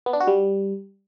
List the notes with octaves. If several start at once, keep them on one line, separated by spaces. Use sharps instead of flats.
B3
D4
F#4
G3